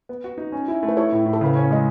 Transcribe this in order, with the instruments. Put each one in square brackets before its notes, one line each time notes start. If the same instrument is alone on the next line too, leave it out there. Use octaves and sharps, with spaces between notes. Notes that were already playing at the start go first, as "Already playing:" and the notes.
[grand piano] B3
F#4
D#4
C#4
E4
A3
[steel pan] B4
[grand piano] E4 [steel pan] A4 C#5
[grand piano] A2
A2
[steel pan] A4
[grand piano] C#3 [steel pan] B4
[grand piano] C#4 [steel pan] C#5
[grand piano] G#3 [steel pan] D#5